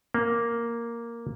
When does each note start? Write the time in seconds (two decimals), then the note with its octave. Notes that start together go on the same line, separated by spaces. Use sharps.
0.14 A#3